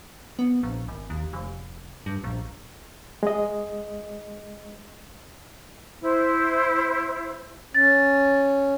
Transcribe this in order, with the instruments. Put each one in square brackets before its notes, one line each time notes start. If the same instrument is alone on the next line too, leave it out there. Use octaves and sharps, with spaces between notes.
[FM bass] B3
A#1
G#1
D#2
F1
G2
A#1
[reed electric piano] G#3 D#5
[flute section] E4 C5
[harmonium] C#4 [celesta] A6